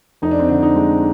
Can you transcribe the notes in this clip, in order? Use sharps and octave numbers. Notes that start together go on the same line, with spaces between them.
F1 D#4
D4
C4
D3 D4
D#4
G#3